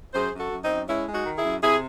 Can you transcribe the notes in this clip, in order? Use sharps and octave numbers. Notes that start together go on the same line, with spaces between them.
F#2 G#4 C5
F#2
F#4 A4
F#2
C4 D#4
F#2
G#3 C#4 E4
G#3
D#4 F#4
D#3
E4 G#4
F#2
C3 E4 G#4